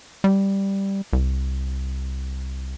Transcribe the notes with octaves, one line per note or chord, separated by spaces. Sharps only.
G3
C2